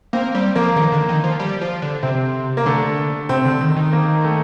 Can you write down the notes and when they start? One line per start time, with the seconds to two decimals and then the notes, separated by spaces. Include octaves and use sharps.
0.13 A#3 C4
0.34 G3 C4
0.55 F3 A#3
0.76 D#3 A#3
0.92 D3
1.09 D#3
1.24 F3
1.39 G3
1.61 F3
1.82 D3
2.03 C3 C4
2.57 A#3
2.66 D3 A3
3.29 C3 C4
3.45 D3
3.61 D#3
3.76 D#3
3.93 A#3
4.24 A3